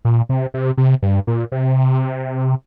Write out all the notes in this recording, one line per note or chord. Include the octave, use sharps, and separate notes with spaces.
A#2
C3
C3
C3
G2
A#2
C3